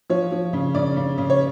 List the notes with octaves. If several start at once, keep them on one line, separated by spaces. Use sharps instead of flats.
F3 C#5
F3
C#3
C#3 D5
C#3
C#3
C#5